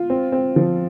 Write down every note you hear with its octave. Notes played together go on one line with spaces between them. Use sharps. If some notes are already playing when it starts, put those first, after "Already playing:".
Already playing: F4
C4
C4
F3